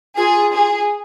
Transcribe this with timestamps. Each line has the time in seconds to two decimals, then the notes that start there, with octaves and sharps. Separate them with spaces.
0.17 F4 G#4
0.54 G#4